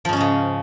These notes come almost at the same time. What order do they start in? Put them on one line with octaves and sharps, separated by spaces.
F3 G#2 C#4 G#3 C#3